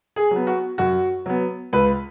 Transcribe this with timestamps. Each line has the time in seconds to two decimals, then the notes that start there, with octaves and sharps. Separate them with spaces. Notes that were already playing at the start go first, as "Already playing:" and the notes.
0.16 G#4
0.31 F#3
0.36 B3
0.47 F#4
0.78 F#2 F#4
1.26 F#3 B3
1.73 C#2 B4